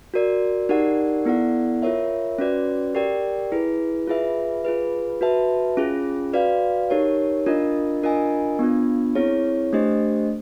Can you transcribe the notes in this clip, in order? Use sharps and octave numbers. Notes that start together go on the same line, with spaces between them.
F#4 A#4 D5
D#4 G4 A#4 D5 F#5
B3 E4 A4 D5 F#5
F4 A#4 C#5 E5
C#4 F#4 B4 D5
G4 A#4 D5 G5
E4 G#4 B4
F4 G#4 B4 E5
F4 G#4 B4
F#4 B4 E5 A5
C#4 F4 G#4
F#4 B4 D5 F5
D#4 G4 A#4 C#5
D4 F4 A#4 D#5
D4 F4 A#4 D#5 G#5
B3 D4 F4
C4 E4 G#4 C#5
A3 D4 G4 C5 D#5